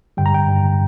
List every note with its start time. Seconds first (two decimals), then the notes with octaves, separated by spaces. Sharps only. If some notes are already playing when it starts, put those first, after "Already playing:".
0.17 G2 D3 G3 G5
0.26 A#5
0.34 G5
0.48 G2 D3 G3